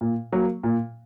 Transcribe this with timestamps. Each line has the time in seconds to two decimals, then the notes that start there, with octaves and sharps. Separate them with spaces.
0.01 A#2
0.32 F#3 A#3
0.63 A#2